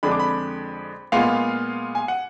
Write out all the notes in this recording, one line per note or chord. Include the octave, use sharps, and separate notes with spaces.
F2 D3 G#3 D4 B5
D6
B5
A#2 G#3 B3 F4 F5
G#5
F#5